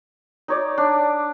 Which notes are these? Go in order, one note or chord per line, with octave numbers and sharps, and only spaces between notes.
D#4 C#5 D5
D4